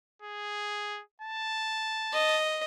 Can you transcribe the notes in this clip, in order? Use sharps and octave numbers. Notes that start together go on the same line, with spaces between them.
G#4
A5
D#5